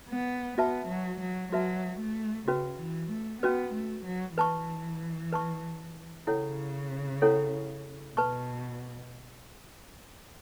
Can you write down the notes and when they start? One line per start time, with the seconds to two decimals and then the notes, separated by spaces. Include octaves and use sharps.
0.10 B3
0.58 B3 F#4 B4 E5 A5
0.89 F#3
1.21 F#3
1.52 F#3 F#4 B4 E5 A5
2.00 A3
2.48 C#3 C#4 F#4 B4
2.79 E3
3.11 A3
3.42 B3 C#4 F#4 B4
3.74 A3
4.06 F#3
4.37 E3 B4 A5 C#6
5.32 B4 A5 C#6
6.27 C#3 C#4 E4 A4 C#5 F#5
7.22 C#4 E4 A4 C#5 F#5
8.17 B2 B4 A5 C#6